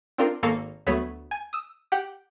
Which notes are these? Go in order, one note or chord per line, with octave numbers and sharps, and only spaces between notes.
C4 D4 F4 A#4
G#1 A#3 A4 F5 A#5 C#6
D2 F#3 A3 B3 C#5
G#5
D#6 E6
G4 F#5 G5